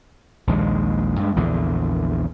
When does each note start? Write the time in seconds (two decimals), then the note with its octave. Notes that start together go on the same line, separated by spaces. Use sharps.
0.47 A#1 D#2 G#3
1.20 G2 G#3
1.36 A#1 E2 D3